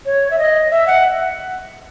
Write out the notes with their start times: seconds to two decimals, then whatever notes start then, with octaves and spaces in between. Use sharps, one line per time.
0.06 C#5
0.31 E5
0.39 D#5
0.71 E5
0.87 F#5